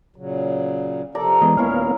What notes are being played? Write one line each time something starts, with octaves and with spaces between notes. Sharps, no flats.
A#2 C#3 F#3
C3 F3 A4 A#4 D5 A#5
E3 G#3 B3 D#5
D#2 A#2 A#3 B3 C#4 E4 A#4 F5